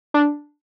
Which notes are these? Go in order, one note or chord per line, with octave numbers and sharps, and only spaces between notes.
D4